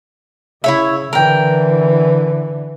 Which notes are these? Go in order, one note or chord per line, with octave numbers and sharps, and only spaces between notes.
C#3 E4 C#5 E5
D3 E3 A#4 G5